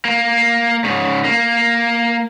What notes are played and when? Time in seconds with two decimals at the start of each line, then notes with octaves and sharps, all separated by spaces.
0.05 A#3
0.84 G#2 C#3
1.24 A#3